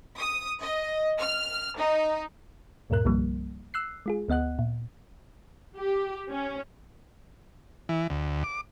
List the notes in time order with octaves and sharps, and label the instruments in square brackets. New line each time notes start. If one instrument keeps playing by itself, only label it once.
[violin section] D#6
D#5
F6
D#4
[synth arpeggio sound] D2 G2 A#2 A#4 F#6
C2 G2 D#3 F3 G3 A#3
E6 F#6 C7
G#3 F4 G#4
D2 B3 D#5 F#5 F#6
A#2
[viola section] G4
C#4
[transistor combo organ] E3
D2
D6